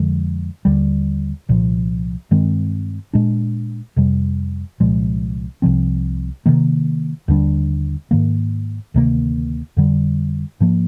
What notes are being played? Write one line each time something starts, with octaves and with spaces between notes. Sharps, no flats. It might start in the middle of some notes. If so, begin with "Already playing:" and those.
Already playing: F2 D3 F3 G#3
D#2 D3 G3
C2 A#2 F3
G2 D#3 G#3 C4
A#2 G#3 D4
F2 C3 G3
C2 A#2 F3 G#3
C2 C3 F3 C4
C3 D#3 A#3
D#2 D3 G3 D4
G#2 D#3 A#3
D2 C3 D#3 A#3
F2 D3 G3
G#2 F3 A#3